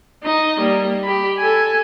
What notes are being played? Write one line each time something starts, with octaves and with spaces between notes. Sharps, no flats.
D#4 D#5
G3 A#3
G4 B5
A4 G#5